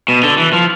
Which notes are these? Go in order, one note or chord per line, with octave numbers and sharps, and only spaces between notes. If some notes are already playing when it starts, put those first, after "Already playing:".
B2
D3
E3
F3